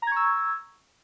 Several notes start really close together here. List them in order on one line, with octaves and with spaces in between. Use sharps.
A#5 G#6 C#6 E6